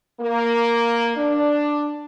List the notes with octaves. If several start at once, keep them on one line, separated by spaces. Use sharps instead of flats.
A#3
D4